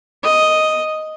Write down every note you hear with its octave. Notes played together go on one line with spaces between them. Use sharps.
D#5